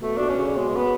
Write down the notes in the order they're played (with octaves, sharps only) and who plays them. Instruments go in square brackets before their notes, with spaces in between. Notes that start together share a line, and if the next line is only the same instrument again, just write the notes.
[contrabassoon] B2 [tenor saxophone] A3
[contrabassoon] B2 [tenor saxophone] D4
[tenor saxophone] C#4
[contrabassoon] C#3
[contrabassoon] B2 [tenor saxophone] G#3
[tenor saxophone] B3